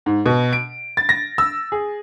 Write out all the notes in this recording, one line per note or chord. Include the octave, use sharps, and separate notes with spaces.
G#2
B2
D7
A6
A#6
E6
G#4